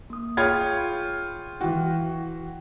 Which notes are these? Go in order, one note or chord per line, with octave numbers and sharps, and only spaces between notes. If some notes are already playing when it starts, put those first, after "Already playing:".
A#3 D#6
F4 G#4 C#5 G5 B5 G6 G#6
E3 F#4 G5